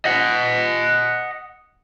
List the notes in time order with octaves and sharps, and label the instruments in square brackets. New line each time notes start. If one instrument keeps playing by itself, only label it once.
[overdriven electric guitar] D#5 F#5